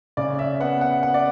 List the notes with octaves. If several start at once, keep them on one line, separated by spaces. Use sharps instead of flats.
C#3 D5
E5
B3 F#5
F#5
B3 F#5
D5